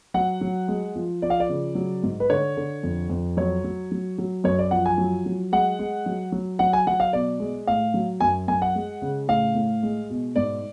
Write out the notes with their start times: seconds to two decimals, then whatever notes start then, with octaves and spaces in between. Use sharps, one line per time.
0.14 F#3 F#5
0.41 F#3
0.68 G#3
0.96 F3
1.22 F3 D5
1.30 F5
1.40 D5
1.49 C#3
1.75 F#3
2.03 G#2
2.20 B4
2.30 D3 C#5
2.57 D3
2.83 F2
3.10 F2
3.37 F#3 C#5
3.64 F#3
3.91 F#3
4.18 F#3
4.44 F#2 C#5
4.59 D5
4.71 F3 F#5
4.86 G#5
4.98 F#3
5.26 F#3
5.52 G#3 F#5
5.79 G#3
6.06 F#3
6.32 F#3
6.59 F#3 F#5
6.73 G#5
6.87 F#3 F#5
7.00 F5
7.13 B2 D5
7.40 G#3
7.67 A2 F5
7.94 F#3
8.20 F#2 G#5
8.48 F#2 G#5
8.62 F#5
8.75 G#3
9.02 C#3
9.28 A2 F5
9.55 A2
9.83 G#3
10.10 B2
10.36 G#2 D5